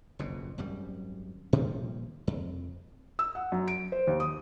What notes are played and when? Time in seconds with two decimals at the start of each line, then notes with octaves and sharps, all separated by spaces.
0.19 F#1 F2 B2
0.58 G#1 F#2 G3
1.53 A#2 D#3 F3 G3
2.27 F2
3.19 E6
3.35 F#5
3.52 F#2
3.68 D7
3.92 C5
4.07 D#2
4.20 D#6